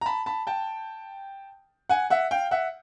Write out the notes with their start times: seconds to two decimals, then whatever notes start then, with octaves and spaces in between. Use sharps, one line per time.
0.01 A#5
0.06 A5 B5
0.26 A5 B5
0.47 G5 A5
1.89 F#5 G#5
2.10 E5 F#5
2.31 F5 G5
2.51 E5 F#5